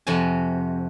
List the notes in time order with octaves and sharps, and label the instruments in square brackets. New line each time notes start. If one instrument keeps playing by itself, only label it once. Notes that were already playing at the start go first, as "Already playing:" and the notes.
[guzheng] F2 C3 F#4 G#5